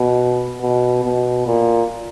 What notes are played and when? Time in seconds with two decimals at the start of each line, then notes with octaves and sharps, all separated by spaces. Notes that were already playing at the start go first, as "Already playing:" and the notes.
Already playing: B2
0.61 B2
1.05 B2
1.47 A#2